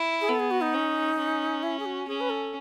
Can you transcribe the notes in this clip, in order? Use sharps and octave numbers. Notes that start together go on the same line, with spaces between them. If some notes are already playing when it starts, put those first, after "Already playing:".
Already playing: E4
G#4
B3 A4
G#4
F#4
D#4
C#4
C#4
E4
G#4
F#4
C#4 G#4
B4
A4